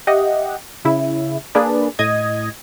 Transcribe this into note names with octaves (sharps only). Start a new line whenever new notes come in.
G4 D#5 E5 F#5
C#3 E4
A#3 D4 G#4 B4 D5
A2 D#5 D#6 G#6